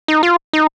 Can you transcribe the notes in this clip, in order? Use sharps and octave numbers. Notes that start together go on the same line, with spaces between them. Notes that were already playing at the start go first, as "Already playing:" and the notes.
D#4
F4
D#4